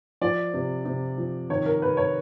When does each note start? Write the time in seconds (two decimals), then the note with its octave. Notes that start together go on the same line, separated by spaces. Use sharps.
0.21 F3 D5
0.54 C3
0.85 C3
1.17 F3
1.50 D#3 C#5
1.66 A#4
1.82 C3 B4
1.97 C#5